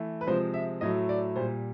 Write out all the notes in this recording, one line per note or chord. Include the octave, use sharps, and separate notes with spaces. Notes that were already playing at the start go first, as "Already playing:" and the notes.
Already playing: E3 A3
B4
C3 F3 G#3 C5
E5
A2 F#3 A3 D#5
D5
A#2 G3 C5